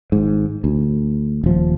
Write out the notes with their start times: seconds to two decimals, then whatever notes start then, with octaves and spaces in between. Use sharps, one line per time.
0.12 G#1 G#2
0.64 D2
1.44 D#1 F3